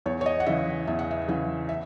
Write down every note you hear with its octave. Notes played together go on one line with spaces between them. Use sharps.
E2 C#5
C#5
D#5
F#5
C#3 E3 E5
E2 E5
F#5
E5
C#3 E3 F#5
E5